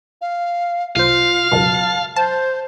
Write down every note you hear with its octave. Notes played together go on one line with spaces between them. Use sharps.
F5
C2 F4 C5 F5
C#2 F#2 B2 A5
C5 A5